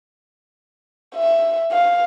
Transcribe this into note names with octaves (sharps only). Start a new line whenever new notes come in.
E5
F5